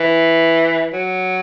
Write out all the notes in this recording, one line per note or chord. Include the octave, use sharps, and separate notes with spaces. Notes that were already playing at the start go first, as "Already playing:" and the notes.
Already playing: E3
F#3